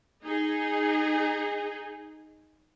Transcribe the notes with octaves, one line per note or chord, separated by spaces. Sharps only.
D#4 G#4